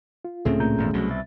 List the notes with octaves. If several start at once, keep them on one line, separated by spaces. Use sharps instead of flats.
F4
C#2 A2 A3 C4 C#4 G#4
A#2 A#5 G6
G#1 E2
C2 B2 F#3
E5 A6